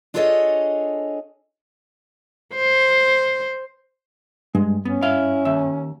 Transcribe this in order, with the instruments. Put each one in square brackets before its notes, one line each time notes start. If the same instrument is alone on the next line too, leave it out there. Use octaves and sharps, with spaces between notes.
[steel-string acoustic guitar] D4 F4 G#4 A4 C#5 D#5
[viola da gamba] C5
[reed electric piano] G2 [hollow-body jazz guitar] G#3
[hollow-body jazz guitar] B3 [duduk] C#4
[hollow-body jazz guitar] E4 F5
D#2 E5